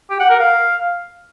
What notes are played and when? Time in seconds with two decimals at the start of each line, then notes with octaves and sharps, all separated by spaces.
0.10 G4
0.20 F#5
0.30 A#4
0.39 F5